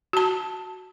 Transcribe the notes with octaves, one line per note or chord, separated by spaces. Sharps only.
F#4 A5